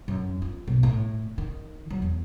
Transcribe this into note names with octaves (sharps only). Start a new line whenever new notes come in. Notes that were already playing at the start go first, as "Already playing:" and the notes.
F#2
F4
B1
A2
D#3
F#3
E2